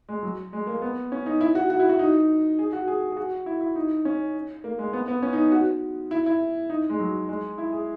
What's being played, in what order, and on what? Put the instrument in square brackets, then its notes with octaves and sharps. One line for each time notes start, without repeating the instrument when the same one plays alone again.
[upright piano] G#3
F#3
G#3
A#3
B3
C#4
D#4
E4
F#4
F#4
E4
F#4
D#4
G#4
F#4
G#4
G#4
F#4
E4
E4
D#4
C#4
A#3
G#3
B3
B3
C#4
D#4
F#4
E4
E4
D#4
G#3
F#3
G#3
E4
G#4